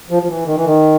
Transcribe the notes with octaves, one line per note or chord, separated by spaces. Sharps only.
F3
F3
E3
D#3
E3
D#3